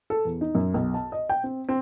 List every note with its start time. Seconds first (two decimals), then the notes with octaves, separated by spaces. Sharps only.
0.10 A4
0.25 E2
0.41 D#4
0.55 F#2
0.74 B1
0.94 A5
1.12 D#5
1.30 G5
1.44 C4
1.69 C4